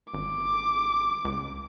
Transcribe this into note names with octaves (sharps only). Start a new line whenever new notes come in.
G#1 D6
C#2